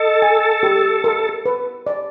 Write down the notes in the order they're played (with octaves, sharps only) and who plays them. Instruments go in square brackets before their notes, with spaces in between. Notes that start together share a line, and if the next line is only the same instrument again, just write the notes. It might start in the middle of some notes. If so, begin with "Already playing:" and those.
Already playing: [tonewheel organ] A4 [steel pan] D#5
[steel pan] G#5
G4
A#4
B4
D5